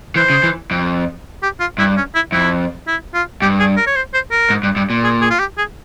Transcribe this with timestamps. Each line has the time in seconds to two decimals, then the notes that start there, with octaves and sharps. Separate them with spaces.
0.16 E3 C5
0.30 C#3
0.43 E3
0.71 F2
1.43 G4
1.60 F4
1.78 G2 E4
1.97 C#4
2.15 E4
2.32 F2 E4
2.88 E4
3.14 F4
3.42 G2 G4
3.59 G#4
3.77 A#4
3.87 C#5
3.96 C5
4.14 C5
4.31 A#4
4.50 G#2
4.63 G2
4.76 G2
4.90 A#2
5.04 G#4
5.22 G#4
5.31 F4
5.40 G4
5.58 G#4